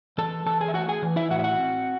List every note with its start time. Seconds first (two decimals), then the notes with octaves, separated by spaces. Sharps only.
0.18 E3 A4 A5
0.46 E3 A4 A5
0.61 G#4 G#5
0.68 E5
0.74 A3 F#4 F#5
0.89 G#4 G#5
1.02 E3
1.16 E4 E5
1.30 A2 F#4 F#5
1.39 E5
1.44 F#4 F#5
1.59 C4